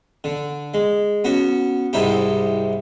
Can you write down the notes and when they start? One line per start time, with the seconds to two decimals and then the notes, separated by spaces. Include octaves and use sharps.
0.24 D3
0.74 G#3
1.24 B3 C#4 F#4
1.93 C2 G#2 C3 D#4 E4 G4